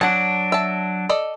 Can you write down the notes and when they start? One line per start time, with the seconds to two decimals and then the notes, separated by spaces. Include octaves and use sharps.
0.01 F#3 D4 F#5 A5
0.52 E5 A5
1.09 A4 D5 D#5